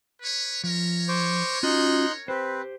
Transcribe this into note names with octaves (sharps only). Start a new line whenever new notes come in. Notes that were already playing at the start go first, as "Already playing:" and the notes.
B4 C#5
F3 A#4 C#5
C5 C#6 D6
C#4 D#4 F4 F#4 C6 F#6
C4 G4 B4 C5